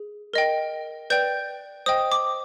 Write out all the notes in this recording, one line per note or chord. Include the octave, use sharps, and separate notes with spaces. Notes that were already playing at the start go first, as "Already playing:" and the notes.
Already playing: G#4
A#4 D#5 G5
B4 D5 G5 G6
C5 D#5 G5 D#6
D6